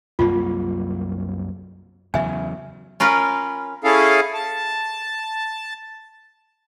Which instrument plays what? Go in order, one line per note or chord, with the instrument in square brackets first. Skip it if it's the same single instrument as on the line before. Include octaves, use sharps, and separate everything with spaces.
[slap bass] C2 F#2 A#3 [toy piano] F4
[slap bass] E2 C#3 F#3 [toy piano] E5 G#5
[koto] C#4 F4 A#4 B4
[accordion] C#4 E4 G#4 A4 F5
A5